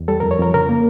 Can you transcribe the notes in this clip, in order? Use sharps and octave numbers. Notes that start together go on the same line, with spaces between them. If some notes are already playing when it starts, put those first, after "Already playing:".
Already playing: E2
G3 A4
F2 A#4
C#5
F2 A#4
C#3 A#4
A#3